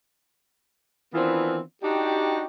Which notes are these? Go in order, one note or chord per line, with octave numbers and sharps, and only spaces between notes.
D#3 E3 B3 C4 D4 F4
D4 D#4 F#4 G4